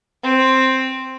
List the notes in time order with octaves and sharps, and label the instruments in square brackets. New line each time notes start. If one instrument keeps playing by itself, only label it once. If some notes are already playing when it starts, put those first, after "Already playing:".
[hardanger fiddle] C4